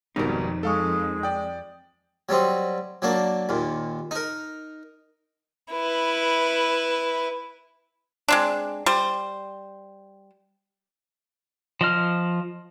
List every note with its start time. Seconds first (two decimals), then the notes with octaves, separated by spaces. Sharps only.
0.16 G#1 F2 B2 G3 D#4 A#4
0.63 G#3 A4 F5 C#6
1.23 D5 G5
2.29 F#3 G3 C4 D#5
3.02 F#3 A#3 D4
3.49 D#2 A#2
4.11 D#4 A#4
5.73 E4 B4
8.28 G#3 C4 D4
8.86 G3 C5
11.81 F3 D#5 F6